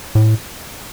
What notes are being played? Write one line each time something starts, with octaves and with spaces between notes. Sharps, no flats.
A2